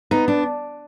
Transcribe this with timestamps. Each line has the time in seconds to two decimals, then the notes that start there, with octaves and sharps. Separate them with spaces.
0.11 B3 D#4
0.28 D4